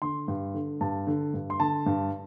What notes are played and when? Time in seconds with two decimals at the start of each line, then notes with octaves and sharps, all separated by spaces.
0.02 D3 C6
0.28 G2
0.54 D3
0.81 G2 A5
1.07 D3
1.34 G2
1.50 C6
1.60 D3 A5
1.86 G2